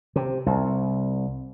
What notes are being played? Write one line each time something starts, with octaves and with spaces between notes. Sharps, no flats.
C3
C2